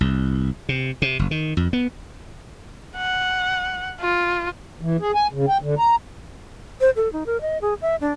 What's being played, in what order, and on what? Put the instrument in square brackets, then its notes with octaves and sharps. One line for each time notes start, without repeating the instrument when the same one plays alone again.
[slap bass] C2
C3
C3
F#1
D#3
F2
B3
[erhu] F#5
F4
[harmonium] E3
G#4
G#5
C#3
G5
D3
A#5
[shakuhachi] C5
A4
D#4
A#4
D#5
G#4
E5
D4